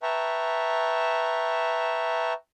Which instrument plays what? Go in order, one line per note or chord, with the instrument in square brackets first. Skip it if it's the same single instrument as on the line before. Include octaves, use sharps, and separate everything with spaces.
[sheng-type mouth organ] B4 E5 G5 A5 A#5 C#6